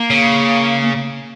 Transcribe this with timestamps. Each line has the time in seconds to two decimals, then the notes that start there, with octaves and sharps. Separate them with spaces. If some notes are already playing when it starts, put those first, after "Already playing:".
Already playing: A#3
0.10 C#3